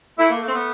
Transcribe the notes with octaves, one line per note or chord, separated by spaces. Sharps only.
A3 E4
A#3
A3 A#3
C4
B3